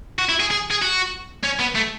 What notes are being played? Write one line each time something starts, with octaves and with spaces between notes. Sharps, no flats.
F#4
E4
G#4
G#4
G#4
F#4
C#4
B3
A3